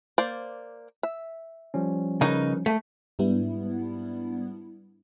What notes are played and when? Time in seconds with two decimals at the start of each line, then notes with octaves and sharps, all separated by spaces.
0.18 A#3 C5 D5
1.03 E5
1.74 F3 G3 C#4
2.21 C#3 D#4 A#4 B4
2.66 A3
3.19 G#2 G3 B3 D4 E4